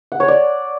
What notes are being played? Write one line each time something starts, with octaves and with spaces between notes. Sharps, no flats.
F#5
C#5
D5